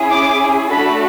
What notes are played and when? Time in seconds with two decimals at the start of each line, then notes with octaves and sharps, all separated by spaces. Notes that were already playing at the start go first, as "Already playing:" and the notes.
Already playing: C#4 E4 G#4
0.11 D6
0.71 A3 D4 F#4 A4 B5